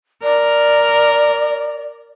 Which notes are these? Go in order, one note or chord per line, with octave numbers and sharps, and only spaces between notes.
A#4 D5